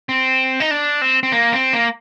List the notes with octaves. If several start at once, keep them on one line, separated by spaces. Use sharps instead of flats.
C4
D#4
D4
C4
C4
A#3
C4
A#3